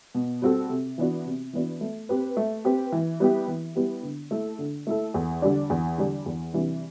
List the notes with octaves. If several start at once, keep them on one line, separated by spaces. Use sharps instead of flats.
B2
G3 C4 F#4 A4
C3
E3 B3 D4 F#4
C3
E3 B3 D4 F#4
A3
C4 G4 B4
A3
C4 G4 B4
E3
G3 B3 E4 G4
E3
G3 B3 E4 G4
D3
A3 E4 A4
D3
A3 E4 A4
E2
D3 G3 D4
E2
D3 G3 D4
E2
C3 E3 G3 D4